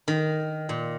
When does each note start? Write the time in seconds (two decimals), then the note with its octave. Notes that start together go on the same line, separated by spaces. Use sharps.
0.08 D#3
0.69 A#2